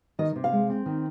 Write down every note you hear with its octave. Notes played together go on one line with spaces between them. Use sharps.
D#3 D#5
C3
F5
G#3
C4
D#3